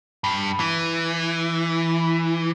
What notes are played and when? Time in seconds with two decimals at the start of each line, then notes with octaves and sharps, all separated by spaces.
0.24 G2
0.60 E3